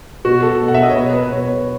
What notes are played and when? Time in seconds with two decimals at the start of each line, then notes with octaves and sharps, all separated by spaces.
0.25 B2 F#4
0.42 A4
0.61 B2
0.68 F#5
0.74 E5
0.82 D#5
0.89 C#5
0.96 B2 B4
1.13 B4
1.31 B2 C#5